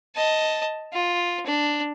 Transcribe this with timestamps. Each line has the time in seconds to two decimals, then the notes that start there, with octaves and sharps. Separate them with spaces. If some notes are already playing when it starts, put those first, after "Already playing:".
0.15 D#5 A5
0.93 F4
1.46 D4